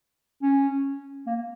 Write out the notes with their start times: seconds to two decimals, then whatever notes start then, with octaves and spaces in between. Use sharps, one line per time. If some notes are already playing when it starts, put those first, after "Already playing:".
0.42 C#4
1.27 A#3